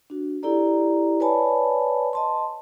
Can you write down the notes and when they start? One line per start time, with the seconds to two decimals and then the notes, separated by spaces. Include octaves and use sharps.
0.10 D4 F#4
0.43 E4 G4 A4 D5 A#5
1.20 B4 C#5 D5 G#5 A5 B5
2.13 D#5 A5 C6